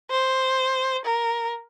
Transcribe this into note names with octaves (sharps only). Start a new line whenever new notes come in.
C5
A#4